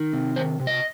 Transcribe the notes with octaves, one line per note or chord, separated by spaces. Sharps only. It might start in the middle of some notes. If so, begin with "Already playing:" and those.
Already playing: D#3
C3
D#3 C5
C3
D#5